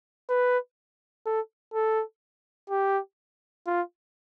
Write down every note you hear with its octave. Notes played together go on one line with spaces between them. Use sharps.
B4
A4
A4
G4
F4